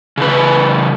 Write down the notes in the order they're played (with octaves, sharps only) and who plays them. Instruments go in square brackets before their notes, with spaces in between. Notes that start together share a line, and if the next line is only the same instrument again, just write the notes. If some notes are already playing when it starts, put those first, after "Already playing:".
[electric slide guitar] C#3 E3 B4